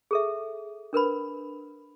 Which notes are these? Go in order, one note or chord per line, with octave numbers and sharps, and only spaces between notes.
G#4 A4 E5
D4 A#4 B4 B5